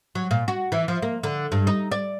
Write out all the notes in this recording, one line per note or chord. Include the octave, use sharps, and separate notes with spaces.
F#3
A#2
F#4
E3
F3
A#3
D3
G2
D#4
D5